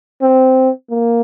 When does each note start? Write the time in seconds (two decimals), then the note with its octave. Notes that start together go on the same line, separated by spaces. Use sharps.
0.22 C4
0.90 A#3